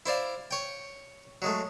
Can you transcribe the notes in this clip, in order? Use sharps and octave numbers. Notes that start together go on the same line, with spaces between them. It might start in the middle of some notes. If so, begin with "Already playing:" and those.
E4 C5 D5 F5
C#5 G5
F#3 G#3 A3